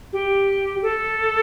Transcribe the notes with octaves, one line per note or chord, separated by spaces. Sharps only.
G4
A4